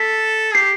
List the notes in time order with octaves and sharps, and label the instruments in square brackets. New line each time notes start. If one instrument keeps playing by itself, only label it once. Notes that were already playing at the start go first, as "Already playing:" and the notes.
Already playing: [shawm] A4 [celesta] B6
[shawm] G4 [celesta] C7